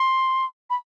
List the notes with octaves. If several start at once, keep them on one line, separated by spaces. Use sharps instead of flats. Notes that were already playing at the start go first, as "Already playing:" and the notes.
Already playing: C6
B5